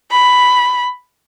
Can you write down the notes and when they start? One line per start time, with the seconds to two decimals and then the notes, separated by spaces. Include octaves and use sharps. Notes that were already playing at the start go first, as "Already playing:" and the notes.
0.11 B5